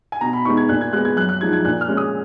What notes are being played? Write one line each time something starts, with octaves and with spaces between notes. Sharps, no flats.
G#5
B2 A#5
B5
G#3 B3 D#4 C#6
G#6
A#2 F#6
G#6
G#3 B3 F#6
G#6
F#2 F#6
F#6
F3 G#3 D#4 G#6
G#6
A#2 F#6
F6
G#3 C#4
D#6